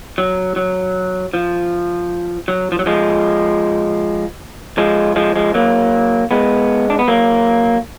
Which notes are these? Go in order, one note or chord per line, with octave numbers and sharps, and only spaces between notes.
F#3
F#3
F3
F#3
F3
F#3
F3 G#3
F3 G#3
F3 G#3
F3 G#3
F#3 A#3
G#3 B3
D4
B3
F#3 A#3